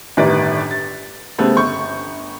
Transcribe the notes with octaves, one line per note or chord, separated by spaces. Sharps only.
G1 A2 D#3 G3 B4 D5
A6
C#3 G3 A3 B3 C4
G1 C#6 G6